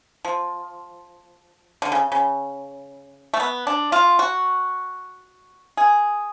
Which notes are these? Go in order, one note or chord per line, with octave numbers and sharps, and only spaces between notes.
F3
D3
C#3
C#3
A3
B3
D4
F4
F#4
G#4